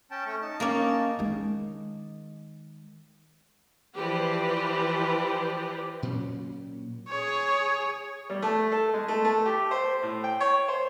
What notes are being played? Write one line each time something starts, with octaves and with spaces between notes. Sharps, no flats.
C#4 G5 A5
A3 C#4 C#6
D#4 A5
A#3 C#4
D#3 G#3
E3 F3 G4 B4 C5 D5
A#2 F#3 C#4
G#4 C#5
G3
A3
A4
G#3
A3
A3
G4
C5
A2
G5
C#5
C5